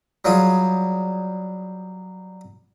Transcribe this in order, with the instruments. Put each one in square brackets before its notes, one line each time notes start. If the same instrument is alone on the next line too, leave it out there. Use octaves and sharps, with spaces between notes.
[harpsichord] F#3 G3 F4 G#4